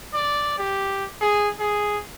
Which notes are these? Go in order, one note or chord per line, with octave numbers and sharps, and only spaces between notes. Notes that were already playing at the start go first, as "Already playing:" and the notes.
D5
G4
G#4
G#4